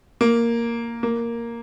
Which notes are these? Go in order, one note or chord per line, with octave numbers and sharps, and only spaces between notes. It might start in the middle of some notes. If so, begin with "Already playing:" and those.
A#3
A#3